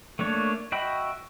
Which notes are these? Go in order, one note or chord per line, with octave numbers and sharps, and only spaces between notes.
A3 A#3 D4 C#5
F#4 D#5 E5 G5 B5